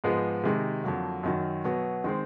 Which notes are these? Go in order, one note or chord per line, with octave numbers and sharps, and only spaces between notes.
G#2 F3 G#3 B3
C3 D#3 G#3
F2 D3 F#3 A#3
F#2 D#3 F#3
B2 F#3 B3
D#3 G#3 C4